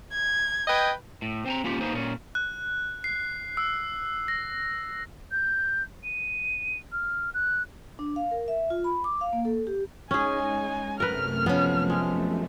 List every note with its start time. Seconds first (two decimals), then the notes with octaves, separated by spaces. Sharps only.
0.13 G#6
0.68 B4 D#5 G5
1.22 A2
1.46 C4 G#5 A#5
1.64 A#3 C#4 F4 G4
1.81 A#3 B3 D#4 C5
1.94 A#2 C#4
2.35 F#6
3.04 C7
3.57 E6
4.28 A#6
5.32 G6
6.04 D#7
6.92 F6
7.34 F#6
7.99 D4
8.16 F5
8.31 A#4
8.48 E5
8.70 F4
8.84 B5
9.04 D6
9.21 F5
9.33 A#3
9.45 A4
9.67 G4
10.11 G#3 C#4 D#4 G#4 G#5
11.00 F#2 C3 A3 A#4 B4 F6
11.46 F3 B3 C#4
11.90 G#3